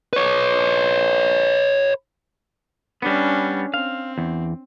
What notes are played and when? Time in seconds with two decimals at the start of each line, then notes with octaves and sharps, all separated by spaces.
0.13 B4 C#5
3.02 G3 B3 C#4 D4
3.74 C4 F5
4.18 E2